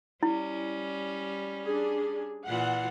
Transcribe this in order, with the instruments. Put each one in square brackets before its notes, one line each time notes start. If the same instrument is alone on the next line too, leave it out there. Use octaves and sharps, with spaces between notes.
[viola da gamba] G3 C#4 [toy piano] E4
[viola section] D4 G#4
[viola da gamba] A#2 E3 F4 [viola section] F#5